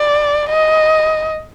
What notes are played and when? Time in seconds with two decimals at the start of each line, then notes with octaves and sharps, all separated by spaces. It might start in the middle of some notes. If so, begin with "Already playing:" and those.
Already playing: D5
0.49 D#5